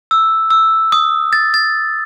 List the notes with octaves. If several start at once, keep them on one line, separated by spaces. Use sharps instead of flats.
E6
E6
D#6
A6
A6